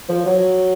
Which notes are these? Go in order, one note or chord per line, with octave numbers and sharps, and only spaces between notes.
F3
F#3